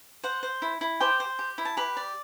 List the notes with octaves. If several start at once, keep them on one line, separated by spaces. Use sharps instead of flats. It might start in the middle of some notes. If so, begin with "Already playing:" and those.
C5 F#5
C5
E4
E4
G4 C5 G5
C5
G4
E4
A5
G4 B4 B5
D5